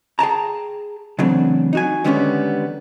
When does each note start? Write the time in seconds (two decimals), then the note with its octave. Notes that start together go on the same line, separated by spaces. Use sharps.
0.19 G#4 G5 A5 A#5
1.19 C#3 E3 F#3 A3 C4 D4
1.73 D#4 F#4 G#5
2.04 D3 D#3 G3 G#3 B3 C#4